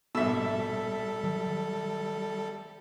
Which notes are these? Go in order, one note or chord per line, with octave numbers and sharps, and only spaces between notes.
A#1 G#2 B2 G3 A4 E5 E6
D#3 F#3